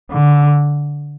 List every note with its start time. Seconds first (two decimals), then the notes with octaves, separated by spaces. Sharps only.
0.11 D3